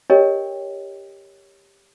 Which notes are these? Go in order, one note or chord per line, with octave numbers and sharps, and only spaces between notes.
G4 A#4 C#5 D#5 G5